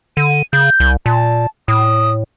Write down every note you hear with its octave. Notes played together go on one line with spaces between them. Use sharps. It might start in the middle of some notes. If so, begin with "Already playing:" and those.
D3 D#7
C#3 G6
C2
A#2 A5
A2 D#6